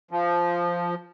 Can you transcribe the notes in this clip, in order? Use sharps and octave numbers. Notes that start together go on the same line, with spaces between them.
F3